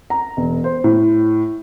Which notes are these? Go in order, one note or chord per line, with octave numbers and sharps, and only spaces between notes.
A#5
E1
C5
A2